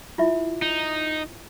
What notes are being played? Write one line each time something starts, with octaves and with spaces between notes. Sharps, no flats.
E4 F4 E5
D#4